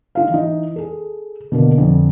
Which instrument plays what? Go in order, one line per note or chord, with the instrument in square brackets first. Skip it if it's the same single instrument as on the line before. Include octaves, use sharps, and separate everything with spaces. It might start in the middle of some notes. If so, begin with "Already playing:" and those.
[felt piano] D#4 F4 F5
E3 D#4
G#4 A4
B2 D3 A#3
F2 D3